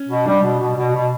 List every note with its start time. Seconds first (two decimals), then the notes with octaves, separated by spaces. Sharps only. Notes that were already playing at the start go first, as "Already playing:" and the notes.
Already playing: C#4
0.09 B2
0.26 G3 D4
0.43 B2
0.60 B2
0.77 B2
0.93 B2